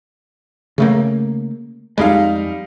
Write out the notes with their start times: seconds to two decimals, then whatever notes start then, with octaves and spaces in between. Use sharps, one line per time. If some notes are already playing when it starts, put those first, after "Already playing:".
0.78 C#3 A3 A#3
1.98 F2 G3 G#3 D#4 F5